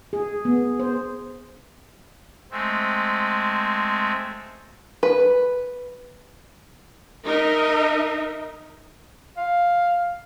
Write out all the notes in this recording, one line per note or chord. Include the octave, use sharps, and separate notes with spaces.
G#4
B3
C5
G#3 A3 C4
B4
D#4 A#4 D#5 E5
F5